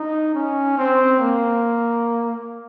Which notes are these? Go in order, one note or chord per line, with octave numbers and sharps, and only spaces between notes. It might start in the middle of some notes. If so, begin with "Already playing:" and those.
Already playing: D#4
C#4
C4
A#3